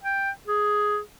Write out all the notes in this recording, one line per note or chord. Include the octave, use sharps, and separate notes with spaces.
G5
G#4